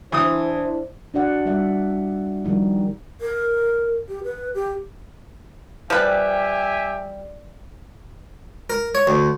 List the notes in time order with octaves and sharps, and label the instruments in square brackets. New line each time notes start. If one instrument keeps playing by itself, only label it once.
[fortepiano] E3 D#6 [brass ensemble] D4 E4 C5
[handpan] D4 F#4 D5 F#5
G3 E5
D#3 F3 G3 D#4
[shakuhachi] A#4
G4
B4
G4
[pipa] F3 B4 [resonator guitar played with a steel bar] G3 [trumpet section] G4 E5 G#5
[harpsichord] A#4
C#5
D2